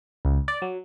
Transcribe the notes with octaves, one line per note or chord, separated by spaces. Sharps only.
C#2
D5
F#3